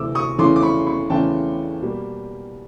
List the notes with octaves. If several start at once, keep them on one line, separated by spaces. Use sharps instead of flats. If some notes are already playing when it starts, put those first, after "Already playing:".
Already playing: D2 C3 E3 A3 D6 E6
C#6 D#6
E2 C#3 E3 A3 C#4 C6 D6
D6
B5 C#6
B5 C#6
E2 C#3 E3 A3 C#4 G5 A5
B2 G3 A#3